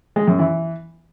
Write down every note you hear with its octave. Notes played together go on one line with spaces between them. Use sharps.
G#3
F#2
E3